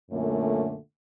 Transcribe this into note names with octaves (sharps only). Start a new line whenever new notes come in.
F#2 A#2 D3 A3